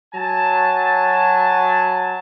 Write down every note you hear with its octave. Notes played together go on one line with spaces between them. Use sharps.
F#3 G#5 A5